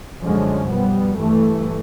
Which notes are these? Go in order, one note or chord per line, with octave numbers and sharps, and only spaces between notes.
F#2 D3 F3 G#3 C#4
B2 G3 B3
G2 E3 A3